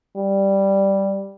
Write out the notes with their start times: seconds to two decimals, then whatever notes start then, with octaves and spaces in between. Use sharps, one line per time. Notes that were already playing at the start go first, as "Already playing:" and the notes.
0.17 G3